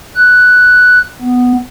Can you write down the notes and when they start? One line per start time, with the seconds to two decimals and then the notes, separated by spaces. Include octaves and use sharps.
0.16 F#6
1.21 B3